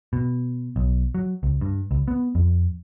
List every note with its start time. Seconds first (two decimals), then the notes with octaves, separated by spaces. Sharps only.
0.13 B2
0.76 B1
1.15 F#3
1.43 C#2
1.61 G2
1.91 C#2
2.08 B3
2.35 F2